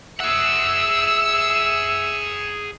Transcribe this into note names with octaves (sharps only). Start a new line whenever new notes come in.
G#4 E5 F#5 E6 C#7 E7